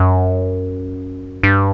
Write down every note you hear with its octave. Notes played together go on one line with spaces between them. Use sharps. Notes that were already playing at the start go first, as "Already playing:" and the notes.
Already playing: F#2
G2